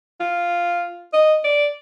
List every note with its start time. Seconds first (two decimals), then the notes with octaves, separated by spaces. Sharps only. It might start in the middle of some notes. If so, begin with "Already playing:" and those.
0.20 F4
1.13 D#5
1.44 D5